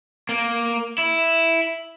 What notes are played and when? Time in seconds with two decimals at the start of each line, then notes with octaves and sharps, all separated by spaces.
0.29 A#3
0.98 E4